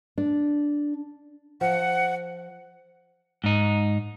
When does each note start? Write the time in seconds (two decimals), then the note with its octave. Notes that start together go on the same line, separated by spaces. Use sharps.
0.18 D4
1.61 F3 F#5
3.44 G#2 D#4